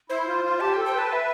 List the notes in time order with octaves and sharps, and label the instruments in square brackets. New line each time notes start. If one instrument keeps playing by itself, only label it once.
[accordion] E4 [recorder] C5
[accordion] F4
F4
[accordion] G4 [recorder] A5
[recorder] G5
[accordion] A4
[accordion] C5 [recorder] G5
[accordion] B4 [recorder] A5
[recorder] E5